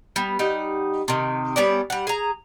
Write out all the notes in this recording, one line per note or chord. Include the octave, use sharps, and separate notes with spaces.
G3 B3
G3 D#4 F#5
C3 D#3
G3 B3 C#4 D5
G3 F#5
G#4 A#5